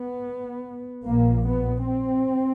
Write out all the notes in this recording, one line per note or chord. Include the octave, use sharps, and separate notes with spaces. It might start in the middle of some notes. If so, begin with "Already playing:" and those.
Already playing: B3
A#1 A#2 A#3
B3
C4